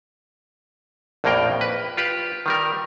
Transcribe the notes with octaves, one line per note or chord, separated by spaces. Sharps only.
A#1 F2 A2 A#3 A#4 G5
B4
F4 G4 B4
D#3 G3 A#4